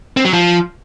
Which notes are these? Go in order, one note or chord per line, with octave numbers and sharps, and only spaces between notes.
C4
F#3
F3